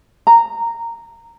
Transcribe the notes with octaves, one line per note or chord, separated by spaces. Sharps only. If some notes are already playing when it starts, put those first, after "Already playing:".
A#5